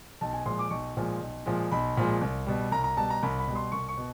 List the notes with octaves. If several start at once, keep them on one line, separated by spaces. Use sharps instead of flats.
B1 A5
G#5
A#2 F3 G#3 C6
D6
B1 C#6
A#2 F3 G#3
B1
A#2 F3 G#3
B1 B5
A#2 F3 G#3
C2
B2 G3
C2 A#5
A#5
B2 G3 A5
A#5
C2 B5
B5
B2 G3
C6
C2 C#6
C#6
B2